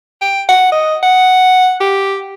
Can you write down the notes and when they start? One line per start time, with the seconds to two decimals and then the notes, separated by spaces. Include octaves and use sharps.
0.21 G5
0.48 F#5
0.72 D#5
1.03 F#5
1.80 G4